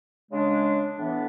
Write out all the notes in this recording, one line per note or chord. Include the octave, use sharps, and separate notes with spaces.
C#3 G#3 D4
A2 E3 B3 D4